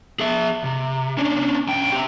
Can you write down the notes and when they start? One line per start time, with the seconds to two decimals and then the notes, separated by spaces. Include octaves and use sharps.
0.20 G#4 E5
0.64 C3
1.17 C#4 D4
1.68 B1 G5
1.92 C4 G4